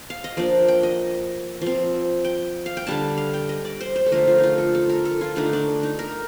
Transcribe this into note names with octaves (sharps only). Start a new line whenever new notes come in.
F5
D#5
F3 A#3 D4 D5
G5
D#5
F3 C4
G5
F5
G5
D3 G3 D4 A5
F5
G5
D#5
D5
C5
C5
A4
D3 F3 A3 A#4
F4
D#4
F4
A4
A4
A#4
A4
F4
D3 A3 D4 D#4
D4
D#4
A#4